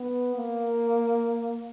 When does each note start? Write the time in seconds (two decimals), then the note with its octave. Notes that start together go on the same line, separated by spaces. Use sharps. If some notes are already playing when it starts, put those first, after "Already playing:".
Already playing: B3
0.36 A#3